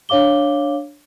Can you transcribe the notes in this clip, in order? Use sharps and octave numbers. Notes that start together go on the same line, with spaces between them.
D4 C#5 F5 D6 G7